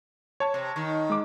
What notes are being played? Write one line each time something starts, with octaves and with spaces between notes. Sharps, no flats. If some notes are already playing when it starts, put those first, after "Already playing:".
C#5 A5 G#6
C3
D#3
G#3 D6